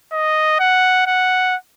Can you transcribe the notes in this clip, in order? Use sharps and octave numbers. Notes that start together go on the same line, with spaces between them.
D#5
F#5
F#5